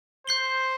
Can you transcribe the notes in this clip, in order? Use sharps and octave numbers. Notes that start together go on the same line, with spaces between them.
C5 G6 C7 G7